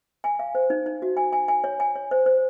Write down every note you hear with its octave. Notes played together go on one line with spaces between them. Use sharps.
G#5
F5
C5
D#4
D#4
F#4
G#5
G#5
G#5
C#5
G#5
C#5
C5
C5